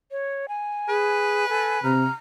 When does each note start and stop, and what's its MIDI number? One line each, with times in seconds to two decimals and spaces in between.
0.11 0.46 73
0.48 1.46 80
0.89 1.48 68
0.89 1.93 71
1.49 1.79 69
1.49 1.80 80
1.84 2.07 48
1.84 2.13 82
1.84 2.12 89